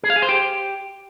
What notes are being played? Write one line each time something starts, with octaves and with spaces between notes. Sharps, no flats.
G#4
F5
G#4
C5
G4